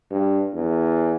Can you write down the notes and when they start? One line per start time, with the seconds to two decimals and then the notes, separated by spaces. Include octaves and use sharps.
0.11 G2
0.53 E2